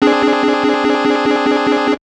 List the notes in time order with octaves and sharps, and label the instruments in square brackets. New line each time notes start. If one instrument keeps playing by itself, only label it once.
[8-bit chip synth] C4 D4 G#4